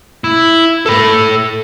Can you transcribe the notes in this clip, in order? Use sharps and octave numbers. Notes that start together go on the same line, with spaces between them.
E4
A4 B5